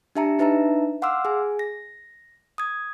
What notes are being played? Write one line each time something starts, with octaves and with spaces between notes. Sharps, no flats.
D4 G4 E5 A5 A#5 C#7
D4 D#4 B4 E5 A5 A#5
F5 F#5 C6 D6 E6 F6
G#4 G#5
A#6
D#6 G#6